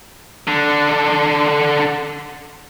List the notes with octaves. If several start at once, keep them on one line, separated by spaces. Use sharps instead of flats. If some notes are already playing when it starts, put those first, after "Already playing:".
D3 D4